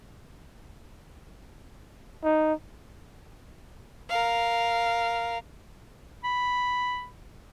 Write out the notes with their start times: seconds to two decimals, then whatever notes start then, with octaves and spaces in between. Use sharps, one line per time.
2.24 D#4
4.09 A#4 F5
6.24 B5